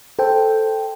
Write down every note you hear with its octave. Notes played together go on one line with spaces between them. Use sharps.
A4 C5 G5